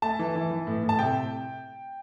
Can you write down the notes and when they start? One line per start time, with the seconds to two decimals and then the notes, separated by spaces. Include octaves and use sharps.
0.02 A3 A5
0.19 E3
0.36 E3
0.51 E3
0.67 A2
0.83 A2
0.89 A5
0.99 C3 G5